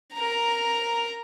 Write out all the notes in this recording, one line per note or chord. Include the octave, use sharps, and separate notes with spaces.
A#4 A#5